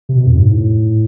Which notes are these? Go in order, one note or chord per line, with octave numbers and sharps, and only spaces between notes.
C3
B2
F2
G#2
A2